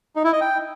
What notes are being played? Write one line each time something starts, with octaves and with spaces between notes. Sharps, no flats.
D#4
E4
D#5
G5